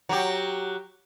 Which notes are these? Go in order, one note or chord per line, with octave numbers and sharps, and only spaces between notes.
F#3 G4